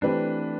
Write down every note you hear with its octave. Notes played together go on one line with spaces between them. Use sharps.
E3 A3 C4 D4 G4 B4